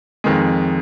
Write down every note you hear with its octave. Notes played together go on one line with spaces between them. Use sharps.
F2 D#3 G#3